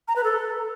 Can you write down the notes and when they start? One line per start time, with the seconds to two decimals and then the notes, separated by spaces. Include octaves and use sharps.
0.08 A#5
0.16 B4
0.24 A4